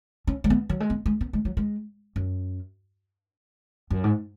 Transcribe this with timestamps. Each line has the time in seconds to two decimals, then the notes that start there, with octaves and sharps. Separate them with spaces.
0.27 C#4
0.44 G#3
0.50 B3
0.69 F#3
0.80 G#3
0.90 B3
1.06 G#3
1.21 B3
1.33 G#3
1.45 F#3
1.57 G#3
2.16 F#2
3.90 F#2
4.04 G#2